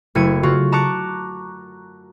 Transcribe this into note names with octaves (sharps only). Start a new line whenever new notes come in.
F#1 A3 E4 G#6 C#7 D#7
C#3 F4 F#4
A5 A#5 C#6 D6 F#6 C#7